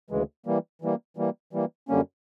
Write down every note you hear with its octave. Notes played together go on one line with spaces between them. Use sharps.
D2 C#3 E3 G#3
E3 G3 A#3
E3 G3 A#3
E3 G3 A#3
E3 G3 A#3
F#2 D3 G3 A#3 C#4